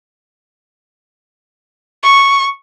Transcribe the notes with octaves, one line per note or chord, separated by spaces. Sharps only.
C#6